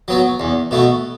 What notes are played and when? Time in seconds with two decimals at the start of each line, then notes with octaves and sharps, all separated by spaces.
0.08 F#3 B3
0.40 E2
0.71 B2 A3